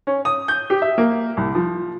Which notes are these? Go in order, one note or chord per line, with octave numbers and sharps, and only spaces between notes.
C#4
D#6
G6
G4
E5
A#3
C2
F3